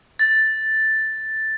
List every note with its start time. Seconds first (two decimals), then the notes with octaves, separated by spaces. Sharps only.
0.19 A6